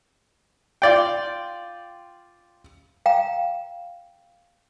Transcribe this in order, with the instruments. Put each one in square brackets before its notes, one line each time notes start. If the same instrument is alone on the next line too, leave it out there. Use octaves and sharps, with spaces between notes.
[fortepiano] F4 D5 G5
[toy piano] F5 G5 A#5